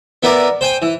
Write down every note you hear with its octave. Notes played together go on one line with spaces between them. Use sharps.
B3 E4 A#4 B4 D5 A#5
C5 G5 G#5
E3